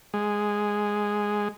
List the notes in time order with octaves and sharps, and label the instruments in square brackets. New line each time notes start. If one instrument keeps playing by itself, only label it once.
[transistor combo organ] G#3